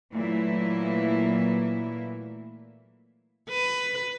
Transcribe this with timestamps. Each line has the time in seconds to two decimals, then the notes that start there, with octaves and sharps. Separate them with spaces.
0.13 A#2 E3 F#3 A3 A#3 E4
3.49 B4